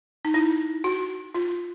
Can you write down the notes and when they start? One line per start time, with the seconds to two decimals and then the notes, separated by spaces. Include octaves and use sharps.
0.25 D#4
0.34 E4
0.84 F#4
1.34 F4